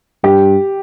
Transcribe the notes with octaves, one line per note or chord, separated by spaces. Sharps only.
G2 G4